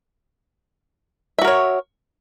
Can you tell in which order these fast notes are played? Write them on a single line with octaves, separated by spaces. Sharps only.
E5 F#4 A#4 C#5